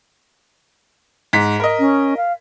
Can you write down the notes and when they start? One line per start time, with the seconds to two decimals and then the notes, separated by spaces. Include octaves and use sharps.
1.33 G#2 B6
1.60 A#4 D#5
1.79 C#4
2.17 F5